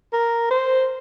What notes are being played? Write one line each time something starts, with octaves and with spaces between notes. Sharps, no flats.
A#4
C5